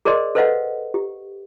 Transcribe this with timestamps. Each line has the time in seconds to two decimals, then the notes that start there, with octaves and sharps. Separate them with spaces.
0.05 G#4 A#4 C5 D5 D#5 C6
0.35 A4 B4 C5 D#5 F5 F#5
0.94 G4